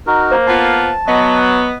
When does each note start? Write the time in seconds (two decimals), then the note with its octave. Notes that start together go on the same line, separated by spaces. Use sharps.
0.07 D#4 F#4 A#4
0.31 A#3 C5
0.47 B3 F4 A5
1.08 F#3 B3 D#5